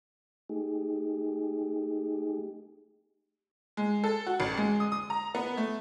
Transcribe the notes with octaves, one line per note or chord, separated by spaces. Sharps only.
A3 D#4 G4 G#4
G#3
A4
F#4
A1
G#3
D#6
D#6
A#5
B3
A3